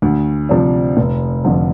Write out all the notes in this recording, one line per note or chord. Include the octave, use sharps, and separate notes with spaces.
D2
C3 F3 D4
F1
F2 D3 F3